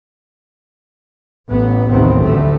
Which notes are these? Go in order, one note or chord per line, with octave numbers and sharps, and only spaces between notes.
A1 B3
A1 D#2 C3 D#3 B3 C4
A1 D2 A2 F#3 A3